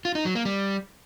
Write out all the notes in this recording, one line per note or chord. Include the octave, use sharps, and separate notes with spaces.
F4
D#4
F#3
A#3
G3